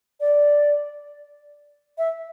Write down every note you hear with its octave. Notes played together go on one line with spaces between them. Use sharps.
D5
E5